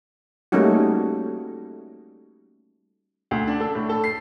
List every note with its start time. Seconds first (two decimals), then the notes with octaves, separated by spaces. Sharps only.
0.52 G3 A3 A#3 C#4 D#4 F#4
3.31 D2
3.47 D4
3.60 A4
3.75 A2
3.89 A4
4.04 C7